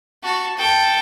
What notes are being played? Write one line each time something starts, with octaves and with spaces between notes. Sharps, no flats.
F#4 A5
A4 G5